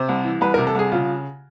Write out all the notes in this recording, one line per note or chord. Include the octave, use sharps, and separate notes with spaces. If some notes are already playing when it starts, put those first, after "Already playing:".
Already playing: C3 C5
C2
E3
C2 B4
C3 A#4
A4
C2 G#4
C#3 F4